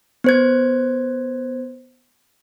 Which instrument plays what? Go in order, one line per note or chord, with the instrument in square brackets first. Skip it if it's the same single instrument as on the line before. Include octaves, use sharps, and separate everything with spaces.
[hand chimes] B3 C5 G#6